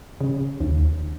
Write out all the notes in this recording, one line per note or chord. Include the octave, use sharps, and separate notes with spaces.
C#3
D#2